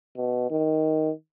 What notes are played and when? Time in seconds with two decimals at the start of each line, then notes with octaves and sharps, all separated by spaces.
0.17 B2
0.51 D#3